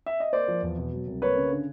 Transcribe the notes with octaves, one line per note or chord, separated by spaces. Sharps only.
E5
D#5
A#3 C5 D5
F3
E2
B2
F#3
C2
A#3 B4 C#5
C#3
D3